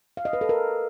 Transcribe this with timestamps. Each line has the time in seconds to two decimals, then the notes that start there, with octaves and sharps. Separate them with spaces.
0.17 F5
0.25 D#5
0.33 B4
0.41 A4
0.49 A#4